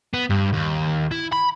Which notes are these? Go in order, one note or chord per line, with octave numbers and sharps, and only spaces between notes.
B3
G2
D#2
E4
B5